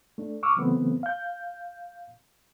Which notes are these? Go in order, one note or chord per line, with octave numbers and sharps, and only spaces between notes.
A3 D4
C#6 D6 E6 F6
C#3 E3 F#3 A3 B3 C4
F5 G6